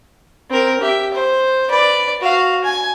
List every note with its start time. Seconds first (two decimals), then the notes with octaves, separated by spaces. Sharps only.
0.50 C4 A#4
0.81 G4 E5
1.14 C5
1.69 B4 D5
2.21 F#4 F5
2.64 G#5